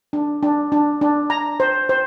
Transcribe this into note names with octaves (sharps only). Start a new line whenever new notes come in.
D4
D4
D4
D4
A#5
C5
C5